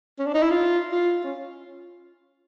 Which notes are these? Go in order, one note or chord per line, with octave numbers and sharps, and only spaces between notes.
C#4
D4
D#4
E4
F4
F4
C#4